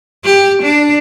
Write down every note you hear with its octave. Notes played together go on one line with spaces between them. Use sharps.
G4
D4